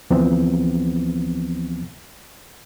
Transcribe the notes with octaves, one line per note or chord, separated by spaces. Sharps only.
D2 E3 F3 B3 C4